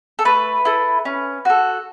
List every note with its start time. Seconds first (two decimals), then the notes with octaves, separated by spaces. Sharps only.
0.19 A4
0.25 A3 B4
0.65 E4 A4
1.05 C#4
1.45 F#4 A4